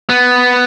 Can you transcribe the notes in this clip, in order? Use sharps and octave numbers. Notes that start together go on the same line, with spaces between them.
B3